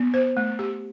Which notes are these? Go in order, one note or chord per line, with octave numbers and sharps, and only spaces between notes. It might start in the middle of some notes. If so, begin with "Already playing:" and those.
Already playing: B3
C5
A3
G4